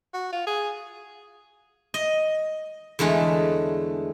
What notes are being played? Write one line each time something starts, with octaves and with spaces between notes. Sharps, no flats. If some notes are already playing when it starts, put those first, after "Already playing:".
F#4
F4
G#4
D#5
E2 D3 G#3 A3 C#5